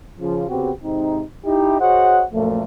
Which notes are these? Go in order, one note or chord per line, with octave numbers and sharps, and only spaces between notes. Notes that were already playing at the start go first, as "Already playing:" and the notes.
C#3 F3
C#3 B3 C4 F#4 G4
G#2 C3 C4 D#4
D#4 E4 G4
F#4 G#4 C5 C#5 D#5 F#5
F#2 A#2 F3 A3